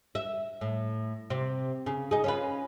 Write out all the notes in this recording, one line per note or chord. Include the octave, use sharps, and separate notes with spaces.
E5
A2
C3
C#3
D#4 G#4
C#4 F4 B4